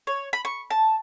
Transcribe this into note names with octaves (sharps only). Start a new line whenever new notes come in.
C#5
B5
C#6
A5